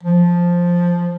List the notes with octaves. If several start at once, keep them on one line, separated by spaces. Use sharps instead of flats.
F3